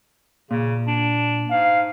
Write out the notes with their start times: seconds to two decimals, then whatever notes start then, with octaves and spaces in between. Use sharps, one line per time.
0.51 A#2 C#3
0.87 D4
1.50 G#2 F5